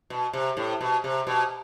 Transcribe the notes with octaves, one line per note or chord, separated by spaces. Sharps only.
B2
C3
A2
B2
C3
B2